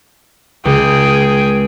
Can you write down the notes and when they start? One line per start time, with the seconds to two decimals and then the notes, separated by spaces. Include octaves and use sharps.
0.65 C#2 G#4 G5